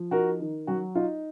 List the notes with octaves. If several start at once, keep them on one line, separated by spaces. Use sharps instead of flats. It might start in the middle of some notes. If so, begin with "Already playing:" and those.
Already playing: F3
D#4 F#4 A#4
D#3
F#3 F#4
D#4 F4